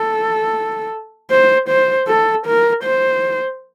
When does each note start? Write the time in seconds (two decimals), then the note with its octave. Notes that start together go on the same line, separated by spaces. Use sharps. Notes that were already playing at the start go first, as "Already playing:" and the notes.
Already playing: A4
1.31 C5
1.69 C5
2.08 A4
2.46 A#4
2.84 C5